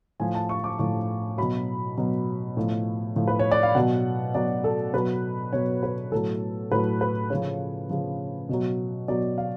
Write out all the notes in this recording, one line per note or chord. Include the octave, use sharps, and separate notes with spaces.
A2 F3 G#5
A5
C#6
D6
A2 F3 C#6
B2 F#3 B5
B2 F#3
A2 F3
A2 F3
B4
C#5
D5
F5
B2 F#3 F#5
B2 F#3 D5
A4
B2 F#3 B4
B2 F#3 C#5
B4
A2 F#3 A4
A2 F#3 B4
B4
C#3 F3 C#5
C#3 F3
B2 F#3
B2 F#3 D5
F5